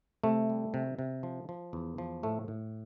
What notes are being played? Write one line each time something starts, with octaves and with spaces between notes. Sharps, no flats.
C3 A3
G3
C3
C3
F3
F3
E2
F3
A2 A3
A2